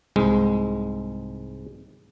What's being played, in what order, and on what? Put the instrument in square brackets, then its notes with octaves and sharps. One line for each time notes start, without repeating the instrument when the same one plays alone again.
[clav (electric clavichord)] C2 G#2 G#3